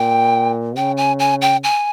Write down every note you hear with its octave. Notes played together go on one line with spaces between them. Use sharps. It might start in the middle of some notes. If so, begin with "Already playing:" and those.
Already playing: A#2 G5
C#3 G5
G#5
G#5
G5
G#5